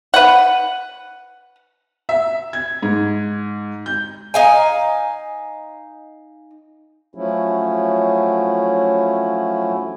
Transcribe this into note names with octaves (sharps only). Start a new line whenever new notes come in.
B4 F#5
E5
G#6
G#2
G6
D#4 F5 G#5
F3 F#3 A3 C#4 E4